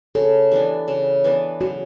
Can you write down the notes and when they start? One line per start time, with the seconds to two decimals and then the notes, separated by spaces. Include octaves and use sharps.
0.15 C#3 A4
0.52 E3 B3 D4 G4
0.88 C#3
1.24 E3 B3 D4
1.60 C#3 F#4